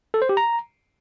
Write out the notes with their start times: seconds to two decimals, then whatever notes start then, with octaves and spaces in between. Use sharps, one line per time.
0.14 A4
0.22 C5
0.29 G4
0.37 A#5